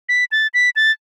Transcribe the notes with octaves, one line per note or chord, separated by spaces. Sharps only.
B6
A6
B6
A6